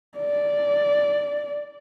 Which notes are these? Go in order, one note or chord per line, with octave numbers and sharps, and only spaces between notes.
D5